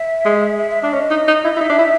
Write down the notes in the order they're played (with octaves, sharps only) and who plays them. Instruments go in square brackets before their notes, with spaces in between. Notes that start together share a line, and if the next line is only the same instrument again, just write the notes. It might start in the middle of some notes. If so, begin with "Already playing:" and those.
Already playing: [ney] E5
[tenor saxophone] G#3
[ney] E5
E5
[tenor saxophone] D4 [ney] D5
[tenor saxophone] C#4 [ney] D#5
[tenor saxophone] D#4
D#4
E4
E4
[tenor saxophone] D#4 [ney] E5
[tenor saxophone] D4
E4